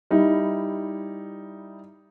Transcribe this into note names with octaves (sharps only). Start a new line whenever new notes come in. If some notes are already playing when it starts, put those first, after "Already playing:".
G3 D#4 E4